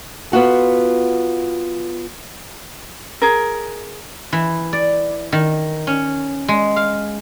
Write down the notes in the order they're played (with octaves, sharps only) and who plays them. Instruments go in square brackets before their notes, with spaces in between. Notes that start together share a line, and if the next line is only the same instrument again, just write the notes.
[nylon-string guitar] B3 F4 F#4 A4
[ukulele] G#4 A#4
[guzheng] E3
D5
D#3
C#4
G#3
F5